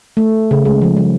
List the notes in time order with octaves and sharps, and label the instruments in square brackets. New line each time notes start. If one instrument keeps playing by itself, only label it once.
[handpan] A3
C#3
G#3
F3
G3